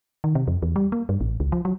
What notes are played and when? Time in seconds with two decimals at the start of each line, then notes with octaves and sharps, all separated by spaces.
0.24 D#3
0.35 C3
0.48 F2
0.62 E2
0.76 G3
0.92 A#3
1.09 G2
1.21 A1
1.40 C#2
1.52 F3
1.65 F#3